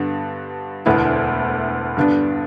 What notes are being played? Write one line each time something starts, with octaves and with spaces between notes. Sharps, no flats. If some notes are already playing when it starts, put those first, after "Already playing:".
Already playing: G2 D3 B3
E1 D2 D3 B3 E4
G2 D3 B3 D4